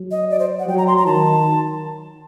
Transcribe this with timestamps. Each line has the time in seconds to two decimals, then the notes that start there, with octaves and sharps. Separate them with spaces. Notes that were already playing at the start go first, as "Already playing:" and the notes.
Already playing: F#3
0.11 D#5
0.30 D5
0.39 C5
0.59 F#5
0.68 F#3 G5
0.78 A#5
0.87 C6
0.97 A#5
1.06 D#3 A5